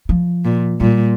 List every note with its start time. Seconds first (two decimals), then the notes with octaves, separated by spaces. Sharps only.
0.09 F3
0.45 A#2
0.80 A#2 G3